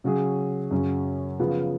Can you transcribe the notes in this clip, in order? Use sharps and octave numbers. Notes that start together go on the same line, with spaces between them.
C#3 F#3 C#4 G#4
F#2 C#3 F#3 C#4
C#3 F3 B3